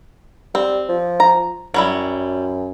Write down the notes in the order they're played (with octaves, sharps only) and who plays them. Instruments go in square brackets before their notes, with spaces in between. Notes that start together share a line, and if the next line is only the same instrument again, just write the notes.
[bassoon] G3 [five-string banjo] C4
[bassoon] F3
[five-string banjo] A#5
[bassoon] F#2 [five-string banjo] F#3 G3 E4